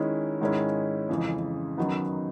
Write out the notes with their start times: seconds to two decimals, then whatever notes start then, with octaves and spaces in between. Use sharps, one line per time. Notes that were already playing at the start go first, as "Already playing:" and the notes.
Already playing: D#3 G#3 C#4 E4
0.41 G#2 D#3 G#3 C#4 E4
1.09 F2 C#3 E3 G#3
1.77 F#2 D#3 F#3 B3 D#4